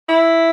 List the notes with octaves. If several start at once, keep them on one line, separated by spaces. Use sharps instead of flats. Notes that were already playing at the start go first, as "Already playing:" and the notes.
E4